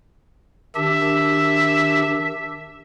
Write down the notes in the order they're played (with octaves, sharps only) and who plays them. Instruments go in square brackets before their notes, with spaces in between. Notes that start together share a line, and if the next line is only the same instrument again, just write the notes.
[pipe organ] D#3 D4 G4 [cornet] E5